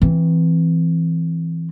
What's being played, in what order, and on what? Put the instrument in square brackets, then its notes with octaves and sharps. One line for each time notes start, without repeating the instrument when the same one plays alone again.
[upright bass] E3 C4